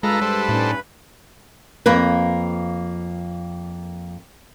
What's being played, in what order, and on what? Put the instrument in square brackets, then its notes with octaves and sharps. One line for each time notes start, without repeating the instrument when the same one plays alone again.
[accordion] G2 B4 B5 [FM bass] G#3 [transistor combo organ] F4 A4 A#5 [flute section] E6
[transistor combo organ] G3 A4 C5
[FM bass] A2 [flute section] C#4 D#4 D5
[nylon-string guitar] F2 A#3 A#4 B4